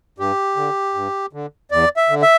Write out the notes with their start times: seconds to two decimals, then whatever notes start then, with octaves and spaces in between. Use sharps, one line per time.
0.18 G2 G4
0.56 D3
0.94 G2
1.33 D3
1.71 E2 D5
1.97 E5
2.09 D3
2.22 E5